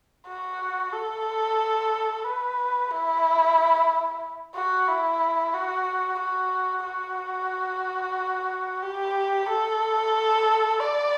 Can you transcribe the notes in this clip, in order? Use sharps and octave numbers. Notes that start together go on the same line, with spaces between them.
F#4
A4
B4
E4
F#4
E4
F#4
F#4
F#4
G4
A4
D5